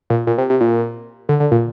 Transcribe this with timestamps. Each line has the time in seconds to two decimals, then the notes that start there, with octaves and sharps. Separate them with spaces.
0.10 A#2
0.27 A#2
0.38 C3
0.50 C3
0.61 A#2
1.29 D3
1.40 D3
1.51 A#2